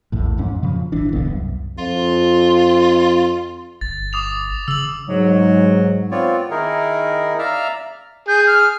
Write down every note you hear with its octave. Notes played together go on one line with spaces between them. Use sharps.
A#1 E2 A2
F2 G#2 C#4
A#2 C#3 F3
G#1 E3 D4
D1 B1 D3 B3
C2 F#2
F2 F4
G1 A6
D6 D#6 F7
C#3 E6 F#7
G#2 F#3
B3 C4 F4 C#5 D5
D#3 D#4 E4 G#4 A#4
D5 E5 F5 A#5 F6
G#4 G6
F6